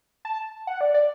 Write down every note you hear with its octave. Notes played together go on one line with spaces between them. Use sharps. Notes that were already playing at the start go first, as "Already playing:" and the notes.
A5
F#5
D5
D5